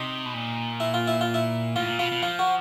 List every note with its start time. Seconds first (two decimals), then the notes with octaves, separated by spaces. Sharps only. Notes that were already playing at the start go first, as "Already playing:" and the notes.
Already playing: C3 D#4
0.26 B2
0.34 A#2
0.80 E4
0.94 F4
1.08 E4
1.21 F4
1.34 E4
1.76 A2 F4
1.87 A#2
1.99 B2 F4
2.12 B2
2.22 F3 F4
2.39 F#4